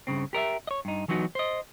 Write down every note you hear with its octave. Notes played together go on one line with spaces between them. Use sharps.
G2 C#3 C4
G4 A#4 D#5 E5
C#5 D#5
G2 D#4
E3 F#3 B3 D#4 F#4
C5 D#5